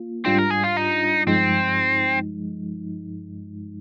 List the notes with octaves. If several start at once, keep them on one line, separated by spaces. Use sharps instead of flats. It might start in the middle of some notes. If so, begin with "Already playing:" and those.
Already playing: A#3 F4
G#2 G3 C4 D4 F4
A#4
G#4
F4
D#4
G2 F3 G#3 C4 D#4